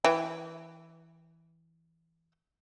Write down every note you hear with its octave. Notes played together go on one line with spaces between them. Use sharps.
E3 E5 G5